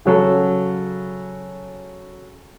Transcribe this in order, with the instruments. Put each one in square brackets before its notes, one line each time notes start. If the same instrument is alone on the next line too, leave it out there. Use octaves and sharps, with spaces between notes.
[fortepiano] C#3 F#3 A4